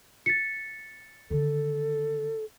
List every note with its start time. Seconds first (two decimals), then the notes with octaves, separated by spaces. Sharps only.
0.26 A6 B6 C#7
1.30 D3 D#3 A4